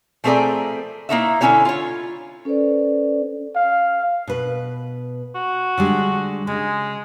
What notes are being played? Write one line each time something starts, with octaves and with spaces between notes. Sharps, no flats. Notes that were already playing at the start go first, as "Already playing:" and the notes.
F3 A3 C4 G#4 A#4 D5
A#3 B3 D#4 E4 C#5 E5
D3 C#4 E4 G4 C#5
F4 C#5
C#4 A4 B4 C5 D5
F5
B2 B4
F#4
D3 G3 G#3
C#3 G#3